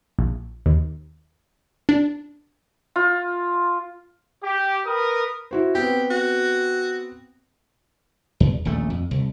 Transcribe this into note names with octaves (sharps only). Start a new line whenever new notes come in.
A#1
D#2
D4
F4
G4
A#4 B4 D#6
E4 F#4 C5
B3 C4 G4
F#4
E2
D#1 A#1 A3
F2
C2